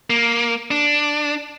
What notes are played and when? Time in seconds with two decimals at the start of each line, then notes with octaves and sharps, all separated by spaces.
0.10 A#3
0.71 D4